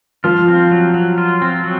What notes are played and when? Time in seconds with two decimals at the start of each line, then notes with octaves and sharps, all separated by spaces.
0.24 F3 F4
0.48 C4
0.71 F#3
0.94 F#3
1.18 F4
1.42 C4
1.64 F#3